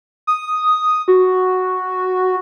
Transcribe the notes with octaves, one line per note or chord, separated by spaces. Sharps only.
D#6
F#4